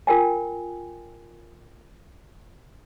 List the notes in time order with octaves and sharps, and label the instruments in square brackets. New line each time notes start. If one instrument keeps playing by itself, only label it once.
[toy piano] F4 A#4 G5 G#5